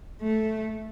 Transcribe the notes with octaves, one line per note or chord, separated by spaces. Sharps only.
A3